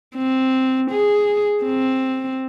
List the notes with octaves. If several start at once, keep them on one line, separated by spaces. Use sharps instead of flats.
C4
G#4
C4